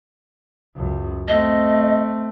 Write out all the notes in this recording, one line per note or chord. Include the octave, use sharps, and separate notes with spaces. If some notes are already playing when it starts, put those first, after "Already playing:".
C#2 F#2
A3 C4 D#5